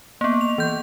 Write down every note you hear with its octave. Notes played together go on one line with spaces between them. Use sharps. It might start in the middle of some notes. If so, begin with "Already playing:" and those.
A#3 B3
F7
E3 G6